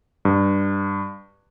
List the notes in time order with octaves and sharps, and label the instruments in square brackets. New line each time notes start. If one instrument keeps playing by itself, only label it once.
[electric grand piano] G2